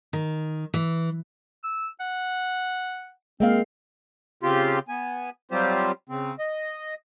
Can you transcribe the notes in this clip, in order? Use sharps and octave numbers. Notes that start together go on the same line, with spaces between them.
D#3
E3
E6
F#5
G#3 A#3 C4 F5
C#3 C4 F4 G4 C6
B3 G#5
F#3 G3 C4 F4 G4 C5
C#3 C4
D#5